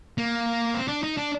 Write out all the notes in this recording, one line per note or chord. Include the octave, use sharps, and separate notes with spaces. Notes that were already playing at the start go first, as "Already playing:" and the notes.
A#3
C4
D4
D#4
D4